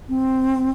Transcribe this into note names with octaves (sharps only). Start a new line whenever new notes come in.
C4